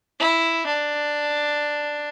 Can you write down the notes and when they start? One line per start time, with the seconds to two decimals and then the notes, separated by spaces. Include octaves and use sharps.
0.20 E4
0.66 D4